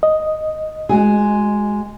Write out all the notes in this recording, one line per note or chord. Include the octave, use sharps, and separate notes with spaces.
D#5
G#3 F#4 G#4